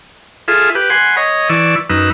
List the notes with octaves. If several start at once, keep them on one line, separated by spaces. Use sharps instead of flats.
F4 G#4 A4 E5
G4 B4
F#5 G#5 B5 C6
C#5 D#5
E3 D5 C#6 E6
F#2 D#4 B4 E6